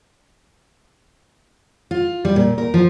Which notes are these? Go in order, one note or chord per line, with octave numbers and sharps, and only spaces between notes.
F4
G3
A#2
A#4
F3